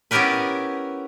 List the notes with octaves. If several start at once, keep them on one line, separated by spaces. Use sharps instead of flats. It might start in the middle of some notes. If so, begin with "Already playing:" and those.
B3 C#4 E4 G4 A#4 B4